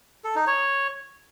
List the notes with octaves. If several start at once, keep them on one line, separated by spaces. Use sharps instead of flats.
A4
D#4
C#5